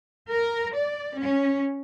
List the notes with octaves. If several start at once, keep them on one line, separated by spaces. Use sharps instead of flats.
A#4
D5
C#4